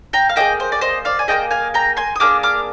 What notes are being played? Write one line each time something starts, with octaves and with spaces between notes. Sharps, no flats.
G5 A#5
F5
A#3 D4 G#4 D#5 G5
C5
D5
C5 D#5
D5 F5
G#5
A#3 D4 G#4 D#5 G5
F5 G#5
G5 A#5
G#5 C6
D#6
A#3 D4 G#4 D6 F6
D6 F6